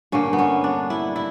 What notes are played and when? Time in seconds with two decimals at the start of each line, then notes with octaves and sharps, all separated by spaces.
0.12 G2 D3 A#3 C#4
0.33 B3
0.39 C#4
0.64 D4
0.90 E4
1.16 E4